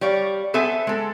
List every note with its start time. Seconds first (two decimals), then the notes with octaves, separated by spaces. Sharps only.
0.01 G3 C#5 D5 F5
0.54 B3 A4 C5 E5 G#5
0.87 G#3 A4